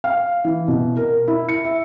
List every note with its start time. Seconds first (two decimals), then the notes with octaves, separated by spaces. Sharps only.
0.04 F5
0.44 E3
0.68 B2
0.97 A#4
1.28 E4
1.49 C#7
1.65 E5